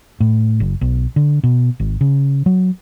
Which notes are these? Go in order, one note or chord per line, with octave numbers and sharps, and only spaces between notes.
A2
F#1
B1
D3
B2
G#1
C#3
F#3